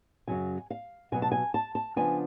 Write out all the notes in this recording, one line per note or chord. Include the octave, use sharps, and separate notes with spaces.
F#2 C#3 F#3 G#5
F5
B2 F#3 B3 G#5
A5
G#5
A5
A5
C#3 F3 B3 D4 G#5